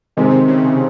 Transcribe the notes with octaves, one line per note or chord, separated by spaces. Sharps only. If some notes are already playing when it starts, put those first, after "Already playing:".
C3 D#3 G#3 C4 D#4 G#4
C#3